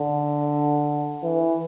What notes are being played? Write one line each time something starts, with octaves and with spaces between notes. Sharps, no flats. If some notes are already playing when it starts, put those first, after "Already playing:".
Already playing: D3
E3